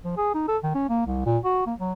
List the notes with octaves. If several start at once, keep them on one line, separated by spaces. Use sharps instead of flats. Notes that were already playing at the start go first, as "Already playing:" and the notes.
F3
G#4
D#4
A4
D#3
C#4
A#3
C2
A#2
F#4
A#3
F#3